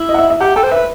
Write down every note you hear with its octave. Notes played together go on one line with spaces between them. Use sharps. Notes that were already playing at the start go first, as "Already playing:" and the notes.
Already playing: E4
D#5
F#5
E5
E5
G4 F#5
A4 G5
C5
B4 E5